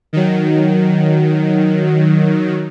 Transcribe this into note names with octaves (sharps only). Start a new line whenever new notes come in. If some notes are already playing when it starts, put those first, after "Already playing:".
D#3 F#3